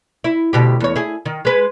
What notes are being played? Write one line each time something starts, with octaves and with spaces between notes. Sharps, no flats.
E4
D2 B2 G4
E2 C#5
E4 G#4
D#3
G#3 B4